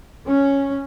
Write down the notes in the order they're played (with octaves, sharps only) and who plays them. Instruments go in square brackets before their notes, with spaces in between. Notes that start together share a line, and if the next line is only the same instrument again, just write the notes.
[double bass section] C#4